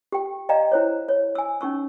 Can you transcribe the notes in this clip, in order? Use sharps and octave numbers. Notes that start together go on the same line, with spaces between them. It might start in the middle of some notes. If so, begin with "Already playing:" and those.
G4 G5
D5 D#5 F5 G5 A#5
E4 C5 C#5
C#5
G#5 E6
C#4 D#4 C#6 E6